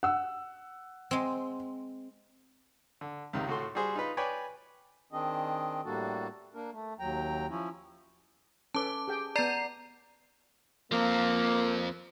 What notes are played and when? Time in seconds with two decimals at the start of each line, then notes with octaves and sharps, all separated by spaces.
0.03 F#5 E6
1.11 G#3 C4
3.01 D3
3.33 C#2 C3 D#3
3.47 A2 F#4 A4 C6
3.75 G3 F#4 G#4 C5
3.96 D#4 F4 B4
4.17 B4 C#5 D5 G5 G#5
5.12 D#3 C4 D4 G#4 D#5
5.85 A2 G3 A#3 D4 F#4 A4
6.54 A#3 D4 A#4
6.73 A3
6.99 D#2 F#3 G5 A#5
7.49 F3 C#4 E4
8.75 C#4 A4 B4 A5 D6
9.08 G4 G#4 G5
9.36 B3 D5 A5 A#5 C7
10.92 F3 A#3 C4